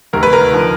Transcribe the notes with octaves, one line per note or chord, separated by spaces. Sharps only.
D2 C3 D#3 A#4
B4
A#4
D3 F3